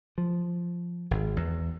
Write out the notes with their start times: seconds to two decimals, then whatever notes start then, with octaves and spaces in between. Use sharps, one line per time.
0.18 F3
1.11 G#1
1.36 E2